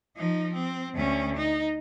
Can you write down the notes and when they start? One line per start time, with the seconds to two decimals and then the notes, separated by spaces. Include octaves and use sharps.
0.16 F3 D#4
0.54 C4
0.95 D2 C#4
1.37 D#4